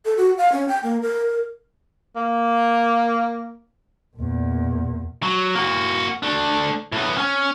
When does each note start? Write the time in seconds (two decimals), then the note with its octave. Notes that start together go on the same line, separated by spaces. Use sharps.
0.05 A4
0.17 F#4
0.38 F5
0.52 C#4
0.68 G5
0.83 A#3
1.02 A#4
2.16 A#3
4.16 E2 A#2
5.23 F#3
5.55 A#3 F#4
6.23 A3 D4
6.92 A2 B3
7.17 C#4